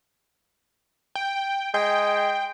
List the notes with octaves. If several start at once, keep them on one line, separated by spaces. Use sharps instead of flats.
G5
G#3 G5